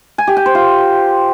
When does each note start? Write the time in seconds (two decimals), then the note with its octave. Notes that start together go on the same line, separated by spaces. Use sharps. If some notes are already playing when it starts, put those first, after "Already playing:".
0.18 G#5
0.27 G4
0.37 G5
0.46 C5
0.55 F4